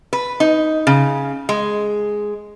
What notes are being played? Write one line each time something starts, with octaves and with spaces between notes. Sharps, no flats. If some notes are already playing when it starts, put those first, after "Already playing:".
B4
D#4
C#3
G#3